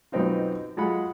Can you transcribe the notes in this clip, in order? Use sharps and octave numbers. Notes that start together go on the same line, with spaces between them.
F#2 B2 B3 C4 D#4 F4
F#3 G#3 F4 F#5 B5